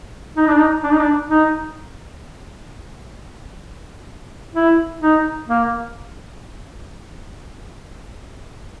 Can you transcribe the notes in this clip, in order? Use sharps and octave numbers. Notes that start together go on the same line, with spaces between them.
D#4
D4
D#4
D4
D#4
D4
D#4
E4
D#4
A#3